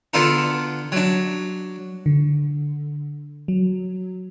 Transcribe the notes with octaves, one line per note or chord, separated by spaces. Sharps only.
D3 B3 D4 F4 A4 A#4
F#3 D4
D3
F#3